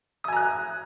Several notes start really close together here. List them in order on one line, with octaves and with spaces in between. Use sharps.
D#6 G#5 A#5 F#6